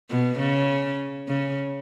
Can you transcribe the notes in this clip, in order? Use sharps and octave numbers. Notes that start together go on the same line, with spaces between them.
B2
C#3
C#3